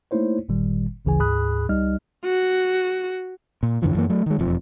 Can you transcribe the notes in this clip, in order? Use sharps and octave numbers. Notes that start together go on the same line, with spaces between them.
A3 A#3 D#4 E4 C5 C#5
G1 A#2 D#3 G3
G#1 D2 C#3 E3 G#4 G#5
D2 G#2 G#4 B5 D#6 F#6
C2 G3 D#4 D#5 F6
F#4
A#2
F#2 D3 E3 F3
F#2 E3 A#3
F#3 A3
D#3 G#3
E1 F2 F3